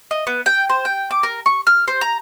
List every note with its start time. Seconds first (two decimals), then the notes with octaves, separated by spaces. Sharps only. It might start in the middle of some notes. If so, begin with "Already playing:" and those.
0.11 D#5
0.27 B3
0.46 G5
0.69 C5
0.85 G5
1.11 D6
1.23 A#4
1.46 C#6
1.67 F6
1.88 C5
2.01 A#5